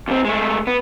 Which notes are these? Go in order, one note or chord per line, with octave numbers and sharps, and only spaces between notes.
D#2 C4
G#3 A3
B3